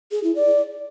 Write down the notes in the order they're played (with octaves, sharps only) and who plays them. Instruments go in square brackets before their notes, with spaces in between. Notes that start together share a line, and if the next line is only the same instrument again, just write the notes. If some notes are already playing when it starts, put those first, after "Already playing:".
[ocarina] G#4
E4
D5